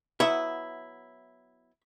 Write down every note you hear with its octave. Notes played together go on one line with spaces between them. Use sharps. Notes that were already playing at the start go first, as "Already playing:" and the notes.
F#3 B3 E4 E5